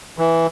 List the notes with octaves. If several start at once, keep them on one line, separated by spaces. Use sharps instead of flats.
E3